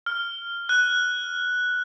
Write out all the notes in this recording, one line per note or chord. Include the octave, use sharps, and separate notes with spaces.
F6
F#6